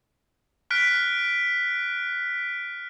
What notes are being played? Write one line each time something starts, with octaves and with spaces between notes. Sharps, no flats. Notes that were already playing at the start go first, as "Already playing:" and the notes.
F6 F#6 B6 D7